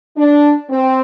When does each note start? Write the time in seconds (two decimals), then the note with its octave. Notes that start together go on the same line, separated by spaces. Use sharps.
0.16 D4
0.69 C4